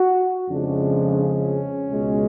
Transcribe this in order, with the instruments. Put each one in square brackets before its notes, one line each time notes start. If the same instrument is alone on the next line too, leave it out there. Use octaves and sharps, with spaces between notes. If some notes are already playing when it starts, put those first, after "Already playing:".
Already playing: [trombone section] F#4
F2 C#3 F3 G#3 D4
C#4
C#2 B2 G#3